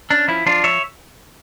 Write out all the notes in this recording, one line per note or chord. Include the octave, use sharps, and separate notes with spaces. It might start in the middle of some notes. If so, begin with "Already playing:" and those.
C#4 D4
F3 E4
F3 D4 F4
F3 C#5 E5